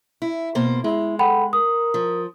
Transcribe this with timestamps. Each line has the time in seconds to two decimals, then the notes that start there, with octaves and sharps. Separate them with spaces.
0.22 E4
0.55 B2 A#3 C5
0.84 G#3 E4
1.19 A4 F#5 G5 B5
1.53 A#4 D#6
1.94 F3